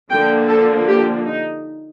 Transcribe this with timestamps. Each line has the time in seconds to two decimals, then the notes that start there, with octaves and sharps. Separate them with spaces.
0.10 D3 F3 A#3 D4 G5
0.48 A4
0.88 G4
1.25 D#4